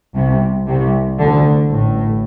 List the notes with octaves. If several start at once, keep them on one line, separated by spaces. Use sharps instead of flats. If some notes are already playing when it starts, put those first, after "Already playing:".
C2 C3
C2 C3
D2 D3
A1 A2